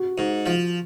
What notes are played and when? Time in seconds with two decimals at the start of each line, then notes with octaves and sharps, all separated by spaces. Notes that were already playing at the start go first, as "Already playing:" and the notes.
Already playing: F#4
0.18 G#2
0.46 F3